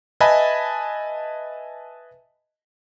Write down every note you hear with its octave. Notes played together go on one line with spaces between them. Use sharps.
B4 D#5 E5 G#5 A5 B5